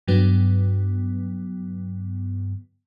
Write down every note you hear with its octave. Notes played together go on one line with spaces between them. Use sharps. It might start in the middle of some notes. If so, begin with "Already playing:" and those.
G2 D3 F#3 B3